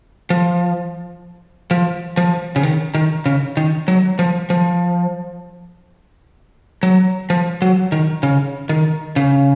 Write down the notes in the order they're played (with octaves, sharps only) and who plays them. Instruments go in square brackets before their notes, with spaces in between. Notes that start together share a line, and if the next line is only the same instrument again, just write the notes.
[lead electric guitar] F3
F3
F3
C#3
D#3
D#3
C#3
D#3
F#3
F3
F3
F#3
F3
F#3
D#3
C#3
D#3
C#3